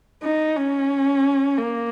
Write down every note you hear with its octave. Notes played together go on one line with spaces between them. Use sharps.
D#4
C#4
A#3